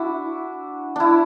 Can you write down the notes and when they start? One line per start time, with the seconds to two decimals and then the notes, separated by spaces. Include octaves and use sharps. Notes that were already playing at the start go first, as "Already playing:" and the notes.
Already playing: D4 E4 F#4
0.96 D4 E4